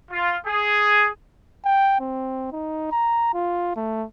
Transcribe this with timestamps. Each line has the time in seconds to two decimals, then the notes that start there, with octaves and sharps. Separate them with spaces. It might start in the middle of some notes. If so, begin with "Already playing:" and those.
0.11 F4
0.47 G#4
1.65 G5
2.00 C4
2.52 D#4
2.91 A#5
3.34 F4
3.76 A3